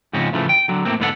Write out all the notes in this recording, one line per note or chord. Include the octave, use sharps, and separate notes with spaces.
G#2 C#3 F3 C4 C#4
A2 C#3 E3 F3 A3
G5
D3 F#3
A2 A#3 C4
G#2 D3 B3 E4 A4 F#5